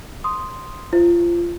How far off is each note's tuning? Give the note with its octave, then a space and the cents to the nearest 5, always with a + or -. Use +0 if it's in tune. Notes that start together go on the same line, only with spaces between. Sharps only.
C6 +0 D#6 +0
F4 -25 C5 +0